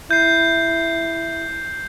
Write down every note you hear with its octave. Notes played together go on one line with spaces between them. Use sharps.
E4 G6 C7